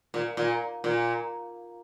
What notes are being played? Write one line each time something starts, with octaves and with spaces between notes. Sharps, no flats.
A#2
A#2
A#2